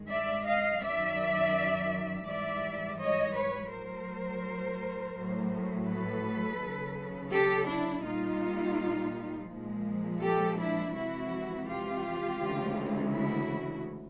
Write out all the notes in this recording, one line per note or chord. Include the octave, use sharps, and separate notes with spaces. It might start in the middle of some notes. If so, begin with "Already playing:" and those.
Already playing: G2 D#3 G#3
D5 E5
D#5 F5
F#2 D#3 F#3 D5 E5
G#2 E3 G3 D5 E5
C#5 D#5
B4 C#5
A2 F#3 A#4 C5
A2 F#3
A4 B4
D#2 C#3 F#3
G4 A4
D4 E4
A#2 G3 D#4 F4
A#2 F3 G#3
G4 A4
D4 E4
F2 C3 E3 G#3 E4 F#4
F4 G4
D2 C#3 E3 G#3
E4 F#4